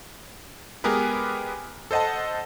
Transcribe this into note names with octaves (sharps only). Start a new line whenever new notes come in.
G#3 B3 G4 G#4 A#4 B4
A4 C5 D#5 F#5 A5